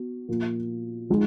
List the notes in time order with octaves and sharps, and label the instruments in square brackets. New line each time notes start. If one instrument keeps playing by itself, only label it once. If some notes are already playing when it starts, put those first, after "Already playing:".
Already playing: [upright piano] B3 F#4
A#2 F3 A#3 F4
F3 G#3 D#4